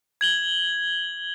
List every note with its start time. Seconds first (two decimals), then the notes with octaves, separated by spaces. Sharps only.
0.21 G#6 F#7 G7